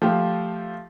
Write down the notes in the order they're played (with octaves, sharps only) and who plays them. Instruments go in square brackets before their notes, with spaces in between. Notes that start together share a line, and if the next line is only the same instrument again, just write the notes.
[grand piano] F3 A3 F4 G4